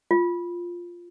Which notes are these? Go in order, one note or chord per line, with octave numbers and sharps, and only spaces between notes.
F4